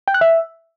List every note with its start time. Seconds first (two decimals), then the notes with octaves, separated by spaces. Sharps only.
0.08 G5
0.14 F#6
0.21 E5